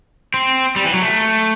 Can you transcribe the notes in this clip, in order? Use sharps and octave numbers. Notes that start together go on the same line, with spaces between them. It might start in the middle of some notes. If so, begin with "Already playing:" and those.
C4
G3
E3
F#3
A3